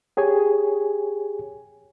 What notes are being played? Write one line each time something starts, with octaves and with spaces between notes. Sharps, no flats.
G4 G#4 C#5 G#5